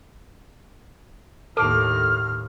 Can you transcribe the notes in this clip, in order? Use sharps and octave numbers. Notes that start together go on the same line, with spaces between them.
D#2 A2 A4 D6 F6